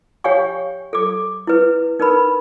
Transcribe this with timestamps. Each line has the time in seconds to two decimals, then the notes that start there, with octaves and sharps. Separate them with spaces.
0.24 G4 C#5 F5 G5 G#5 C#6
0.93 A4 D6
1.47 E4 B4
2.00 D#4 A#4 B4 B5